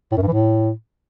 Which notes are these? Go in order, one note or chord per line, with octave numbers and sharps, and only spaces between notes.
A2
F#2
G2
E3
A2